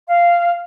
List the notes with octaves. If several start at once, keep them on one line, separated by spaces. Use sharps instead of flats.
F5